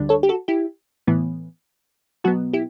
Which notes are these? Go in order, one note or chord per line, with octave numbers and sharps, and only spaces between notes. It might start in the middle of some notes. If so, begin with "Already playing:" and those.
Already playing: D2 D3 G3 D4
A4 C#5
G4
F#4 A4
E4 G4
A2 E3 B3
B2 F#3 B3 F#4
E4 G4